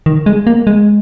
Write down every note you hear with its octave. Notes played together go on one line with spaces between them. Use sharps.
D#3
G#3
A#3
G#3